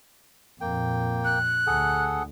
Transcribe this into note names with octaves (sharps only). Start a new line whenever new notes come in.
F2 A#2 A#3 G5
F#6
D2 G#4 A4 F#5